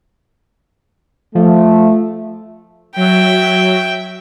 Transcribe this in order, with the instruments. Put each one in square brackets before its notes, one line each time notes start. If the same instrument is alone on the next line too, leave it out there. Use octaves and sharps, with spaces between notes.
[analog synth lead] F3 [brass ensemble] A3
[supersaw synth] F#3 [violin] E5 G5